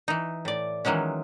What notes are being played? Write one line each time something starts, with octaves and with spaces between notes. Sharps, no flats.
E3 D#4
A2 D5
D#3 E3 F#3 G#3 C#4